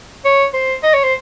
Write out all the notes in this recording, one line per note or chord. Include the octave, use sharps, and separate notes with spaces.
C#5
C5
D#5
C#5
C5